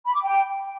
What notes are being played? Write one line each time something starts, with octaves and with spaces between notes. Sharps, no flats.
B5
D6
G5